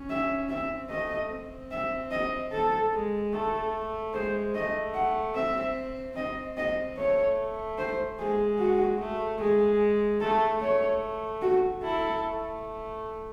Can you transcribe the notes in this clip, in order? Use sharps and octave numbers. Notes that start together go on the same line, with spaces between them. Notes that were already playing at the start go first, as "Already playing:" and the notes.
Already playing: C#4
E5
C4 E5
A3 D#5
C4
E5
D#5
A4
G#3
A3 A4
G#3 C5
A3 D#5
F#5
C4 E5
C4 D#5
D#5
A3 C#5
C5
G#3 G#4
F#4
A3
G#3 G#4
A3 A4
A3 C#5
F#4
E4 A4
A3